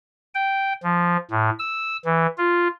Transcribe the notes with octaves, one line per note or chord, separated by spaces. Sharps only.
G5
F3
A2
E6
E3
F4